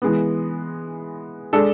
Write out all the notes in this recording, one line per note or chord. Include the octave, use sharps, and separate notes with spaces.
E3 G#3 B3
G#3 D4 A4